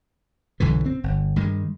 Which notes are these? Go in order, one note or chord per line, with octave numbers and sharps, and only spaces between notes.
B1 F#2 D3 E3
C4
G1
G2 D#3 G#3